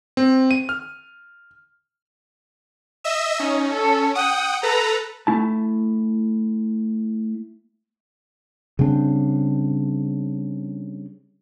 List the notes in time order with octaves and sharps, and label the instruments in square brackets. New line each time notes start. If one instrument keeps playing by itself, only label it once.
[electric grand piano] C4
D#7
F6
[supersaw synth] D#5 E5 E6
[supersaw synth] C#4 [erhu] D#4
[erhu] A4
[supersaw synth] F#5 G5 [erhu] D#6
[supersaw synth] A4 B4 [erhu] A#5
[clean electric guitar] A3 E4 A5
[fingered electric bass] C#3 G3 C4 D4